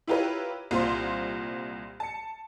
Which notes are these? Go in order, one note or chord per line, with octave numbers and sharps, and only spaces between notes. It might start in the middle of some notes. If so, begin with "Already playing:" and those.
E4 F4 G4 A#4 B4 C#5
C2 A#2 F4 C5 C6
A5 C#7